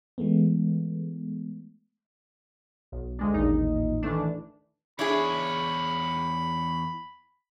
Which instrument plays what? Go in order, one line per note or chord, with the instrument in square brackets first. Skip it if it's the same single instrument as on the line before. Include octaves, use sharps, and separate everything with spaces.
[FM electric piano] E3 G#3 A3 B3
[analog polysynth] B1
D2 G#3 D4
A1 D#2 A#2 D#4
D#3 E3 A3 D4
[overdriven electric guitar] E2 C#5 [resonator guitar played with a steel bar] D4 E4 G#4 [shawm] B5